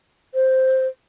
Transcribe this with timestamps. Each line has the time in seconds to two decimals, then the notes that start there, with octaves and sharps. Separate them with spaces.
0.35 C5